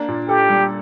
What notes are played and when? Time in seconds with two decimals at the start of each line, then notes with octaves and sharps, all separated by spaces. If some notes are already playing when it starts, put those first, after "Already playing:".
Already playing: A#3 D4
0.08 A#2
0.28 G4 A4
0.50 G3